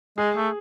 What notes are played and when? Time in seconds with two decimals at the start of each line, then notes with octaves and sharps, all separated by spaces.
0.18 G#3 G#4
0.36 A3